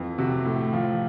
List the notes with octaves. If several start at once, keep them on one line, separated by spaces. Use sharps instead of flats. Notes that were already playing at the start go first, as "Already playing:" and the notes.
Already playing: F2 E3
C3 F#4
A2
F3